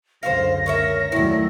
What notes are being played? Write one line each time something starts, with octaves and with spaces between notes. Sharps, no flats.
C#2 F#2 D3 C5 C#5 F5 A#6
C#4 A#4 C#5 E5
D#2 D#3 F#3 A3 D4 E4